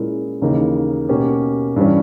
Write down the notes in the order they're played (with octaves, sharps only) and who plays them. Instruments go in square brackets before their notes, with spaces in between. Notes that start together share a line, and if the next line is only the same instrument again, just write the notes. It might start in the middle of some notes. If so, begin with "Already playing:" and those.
Already playing: [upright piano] A#2 G#3 C#4 E4 A#4
D#2 C#3 E3 A#3 D#4
B2 A#3 C#4 G4
G2 E3 G3 C#4